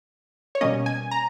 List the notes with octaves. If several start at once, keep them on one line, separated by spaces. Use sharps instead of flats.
C#5
B2 G3 A#3 C#4 D#5
G#5
A#5